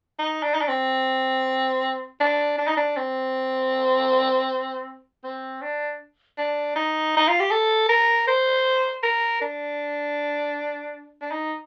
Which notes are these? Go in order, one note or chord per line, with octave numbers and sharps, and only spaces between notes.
D#4
D4
D#4
D4
C4
D4
D4
D#4
D4
C4
C4
D4
D4
D#4
D#4
F4
G4
A4
A#4
C5
A#4
D4
D4
D#4